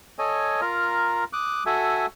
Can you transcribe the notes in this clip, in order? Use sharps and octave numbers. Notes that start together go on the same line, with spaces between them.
A4 C#5 D#5 G#5
F4 A#4 A#5
D6 D#6 F#6
F#4 A4 E5 G#5